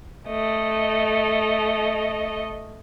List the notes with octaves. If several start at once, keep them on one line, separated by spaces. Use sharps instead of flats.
A3 D#5